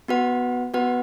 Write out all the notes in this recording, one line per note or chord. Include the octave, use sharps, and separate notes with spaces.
B3 F#4 B4 F#5
B3 F#4 B4 F#5